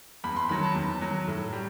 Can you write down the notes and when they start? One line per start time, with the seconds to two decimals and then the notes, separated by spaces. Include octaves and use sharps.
0.24 E2 B5
0.36 C6
0.49 D#3 F#3 B5
0.63 A5
0.75 E2
1.02 D#3 F#3
1.27 A2
1.53 G3